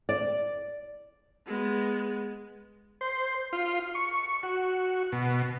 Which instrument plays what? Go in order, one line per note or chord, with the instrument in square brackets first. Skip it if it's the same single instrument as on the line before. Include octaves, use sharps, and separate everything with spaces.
[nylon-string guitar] D5
[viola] G#3 B3
[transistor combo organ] C5
F4
C#6
F#4
B2